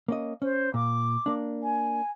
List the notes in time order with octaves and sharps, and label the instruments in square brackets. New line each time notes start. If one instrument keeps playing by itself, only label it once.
[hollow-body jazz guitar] A#3 C#4 D#5
[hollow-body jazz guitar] C#4 [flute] C5
[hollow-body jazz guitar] A#2 [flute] D6
[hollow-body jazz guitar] A#3 D4
[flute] G#5